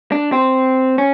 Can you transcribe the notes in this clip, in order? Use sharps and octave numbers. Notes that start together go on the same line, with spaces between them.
D4
C4
C#4